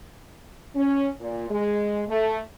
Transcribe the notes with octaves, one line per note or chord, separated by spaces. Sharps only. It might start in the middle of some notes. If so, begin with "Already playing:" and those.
C#4
A#2
G#3
A3